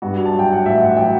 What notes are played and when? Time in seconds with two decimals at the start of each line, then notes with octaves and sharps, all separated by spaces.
0.02 G2 F#4
0.26 A5
0.34 F#3 G5
0.52 F#5
0.65 A1 E5
0.81 F#5
0.97 F#3 G5